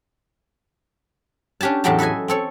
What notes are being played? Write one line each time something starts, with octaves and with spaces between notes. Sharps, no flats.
C#4 D4 G4 G#5 A5
E2 A2 F#3 G4 G5 A5
A4 B4 D#5 E5 G#5
C4 A4 C#5